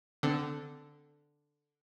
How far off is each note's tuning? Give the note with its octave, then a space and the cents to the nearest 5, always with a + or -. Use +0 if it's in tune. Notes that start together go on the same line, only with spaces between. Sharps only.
D3 +0 C4 -35